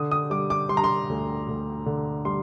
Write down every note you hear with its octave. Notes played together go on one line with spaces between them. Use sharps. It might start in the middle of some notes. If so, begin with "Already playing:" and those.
Already playing: D3 D#6
D#6
G3 D6
D6
G3 C6
A#5
C6
D2
D2
D3
G3 C6